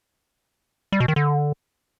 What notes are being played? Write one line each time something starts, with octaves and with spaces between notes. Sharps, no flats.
G3
B2
D#3
D3